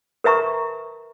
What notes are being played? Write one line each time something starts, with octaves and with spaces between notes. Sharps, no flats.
A#4 B4 E5 A#5 C#6